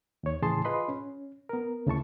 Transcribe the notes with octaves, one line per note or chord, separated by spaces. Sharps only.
D#2 C#5
A2 C#3 E3 G#4 A5 C6
F4 G#4 B4 D#5 B5 C6
C#4
B3 A#4
D2 C#3 E4 A5 C#6